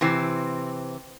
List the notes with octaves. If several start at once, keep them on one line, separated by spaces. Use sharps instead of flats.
C3 E3 C4